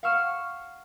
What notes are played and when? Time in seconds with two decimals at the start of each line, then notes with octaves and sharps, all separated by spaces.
0.03 F5 F#5 C#6 E6 F6 E7